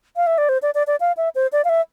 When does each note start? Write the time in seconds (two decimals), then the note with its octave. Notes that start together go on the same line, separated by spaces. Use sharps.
0.16 F5
0.27 E5
0.38 D5
0.49 C5
0.62 D5
0.74 D5
0.87 D5
1.00 F5
1.17 E5
1.35 C5
1.52 D5
1.64 F5
1.69 E5